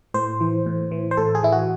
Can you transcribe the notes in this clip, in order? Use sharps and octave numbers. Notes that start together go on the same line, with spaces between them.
A2 C5
E3
A2
E3
C5
A2 A4
G#4
E3 E4
F#4